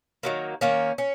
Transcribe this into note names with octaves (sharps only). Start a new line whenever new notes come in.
D#3 F#3 A#3
D#3 A#3 C#4
C#4